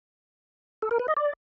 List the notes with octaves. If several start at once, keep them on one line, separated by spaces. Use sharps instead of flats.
A4
A#4
B4
D#5
D5